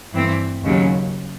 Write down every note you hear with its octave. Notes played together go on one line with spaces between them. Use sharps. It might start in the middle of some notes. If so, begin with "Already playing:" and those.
G2 E3 A3 C4
D#2 C#3 F#3